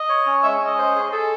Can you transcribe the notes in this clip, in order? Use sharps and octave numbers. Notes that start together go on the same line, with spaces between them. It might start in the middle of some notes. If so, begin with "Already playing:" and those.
Already playing: D#5
C#5
C#4
G#3 E5
C#4 D#5
C5
G#4
G#4 A4